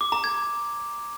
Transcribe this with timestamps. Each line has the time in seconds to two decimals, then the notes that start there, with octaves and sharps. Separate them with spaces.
0.01 D6
0.12 A#5
0.24 G#6